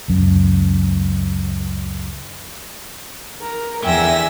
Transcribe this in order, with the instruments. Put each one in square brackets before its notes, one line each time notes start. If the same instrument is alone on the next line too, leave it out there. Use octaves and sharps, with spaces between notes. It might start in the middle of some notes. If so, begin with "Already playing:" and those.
[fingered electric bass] C#2 F#2
[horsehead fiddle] A#4
[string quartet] E2 E6 A#6 [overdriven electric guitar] D3 G5 [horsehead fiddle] E5 G#5